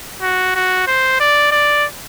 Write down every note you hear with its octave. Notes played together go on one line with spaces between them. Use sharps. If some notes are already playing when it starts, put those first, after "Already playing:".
F#4
F#4
C5
D5
D5